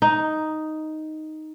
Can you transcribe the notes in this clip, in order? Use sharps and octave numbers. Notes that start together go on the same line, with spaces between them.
D#4